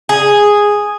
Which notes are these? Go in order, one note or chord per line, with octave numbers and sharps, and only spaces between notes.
G#4